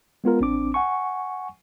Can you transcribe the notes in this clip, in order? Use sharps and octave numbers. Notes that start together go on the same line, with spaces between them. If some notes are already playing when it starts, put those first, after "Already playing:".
G#3 B3 F4 A#4
A1 C4 D4 D6
F#5 G#5 C#6